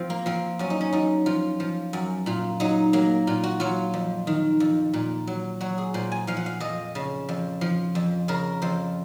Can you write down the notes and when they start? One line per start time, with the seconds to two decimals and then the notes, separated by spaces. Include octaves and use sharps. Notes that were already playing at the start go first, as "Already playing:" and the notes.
Already playing: F3 C4
0.10 A#3
0.26 F3 C4
0.59 F#2 C#4
0.70 D#4
0.81 C#4
0.92 F#2 D#4
1.26 F3 F4
1.60 F3
1.93 F#2
2.26 A#2 F4
2.60 F#3 D#4
2.93 F#3 A#3
3.27 A#2 F4
3.44 F#4
3.60 F#3 F4
3.94 F2
4.27 D#3
4.60 F2
4.93 A#2
5.27 F#3
5.61 F#3 F#4
5.78 G#4
5.94 A#2 C5
6.12 G#5
6.27 F3 F5
6.37 F#5
6.46 F5
6.60 F2 D#5
6.95 C#3
7.29 F2
7.61 F3
7.95 F2
8.28 C#3 A#4
8.62 F2 C5